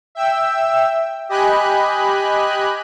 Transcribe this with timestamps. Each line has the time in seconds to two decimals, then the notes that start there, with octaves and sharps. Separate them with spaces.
0.15 E5 G5 E6
1.29 G4 D#5 G#5 B5 F#6